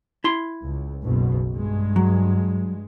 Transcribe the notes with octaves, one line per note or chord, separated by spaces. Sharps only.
E4 C6
C#2
F#1 B1 B2
G2 G#3
F#3